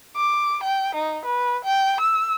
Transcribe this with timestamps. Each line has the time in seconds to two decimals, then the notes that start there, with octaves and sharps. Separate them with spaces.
0.16 D6
0.63 G5
0.95 D#4
1.25 B4
1.64 G5
2.00 E6